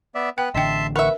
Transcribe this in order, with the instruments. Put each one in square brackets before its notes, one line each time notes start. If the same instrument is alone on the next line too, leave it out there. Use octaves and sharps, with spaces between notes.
[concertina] B3 D5 E5
[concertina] B3 B4 F#6 [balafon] G5
[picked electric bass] A1 D3 [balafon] D#5 G5 [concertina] E5 A5 C6
[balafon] A#4 [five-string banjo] B4 E5 [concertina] F#5 C#6